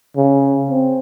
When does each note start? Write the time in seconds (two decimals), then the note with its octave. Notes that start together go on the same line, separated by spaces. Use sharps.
0.17 C#3
0.70 C4